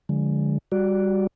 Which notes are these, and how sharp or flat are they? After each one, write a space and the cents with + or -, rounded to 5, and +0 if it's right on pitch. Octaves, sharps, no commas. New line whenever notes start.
D3 +0 F3 +30 G#3 +0
G3 +15 F#4 +0 D5 +0